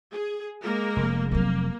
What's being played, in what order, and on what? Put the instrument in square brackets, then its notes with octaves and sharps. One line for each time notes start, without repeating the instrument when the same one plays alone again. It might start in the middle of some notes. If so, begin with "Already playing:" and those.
[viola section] G#4
G#3 A#3 A#4
[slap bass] F1
[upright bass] F#3 C4 [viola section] A#3